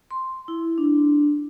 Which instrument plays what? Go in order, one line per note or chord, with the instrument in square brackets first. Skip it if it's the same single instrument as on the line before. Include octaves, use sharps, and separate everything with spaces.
[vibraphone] C6
E4
D4